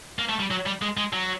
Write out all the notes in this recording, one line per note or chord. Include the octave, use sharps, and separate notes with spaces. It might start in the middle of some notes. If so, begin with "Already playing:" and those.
A#3
A3
G3
F#3
G3
G#3
G#3
F#3